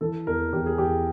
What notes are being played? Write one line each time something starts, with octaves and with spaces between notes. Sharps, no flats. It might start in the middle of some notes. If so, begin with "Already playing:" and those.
E3 A4
E2 A#4
E2 G4
G#4
E2 G4